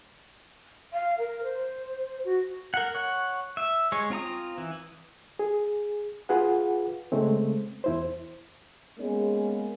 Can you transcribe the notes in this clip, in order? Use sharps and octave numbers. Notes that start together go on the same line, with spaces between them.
F5
A#4
C5
F#4
A#4 F#5
C#5 F#5
E5
G#3 C#5
C4 F4 A#5 D#6
E3
G#4
F4 G#4 B4 F#5
C#3 G#3 A3 C4
E2 E4 C5
G#3 A#3 B3 C#4 G#4